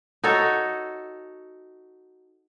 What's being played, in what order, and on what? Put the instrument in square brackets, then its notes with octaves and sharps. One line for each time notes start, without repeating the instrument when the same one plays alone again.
[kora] D#4 F#4 A4 C#5